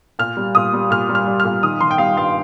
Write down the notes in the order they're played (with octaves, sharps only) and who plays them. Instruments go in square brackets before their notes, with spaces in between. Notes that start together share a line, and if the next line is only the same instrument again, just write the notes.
[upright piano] A#2 F6
G3
A#2 D#6
G3
A#2 F6
G3
F6
G3
A#2 F6
D#3 D#6
D#3 C6
G5
G3 F5
G2 F5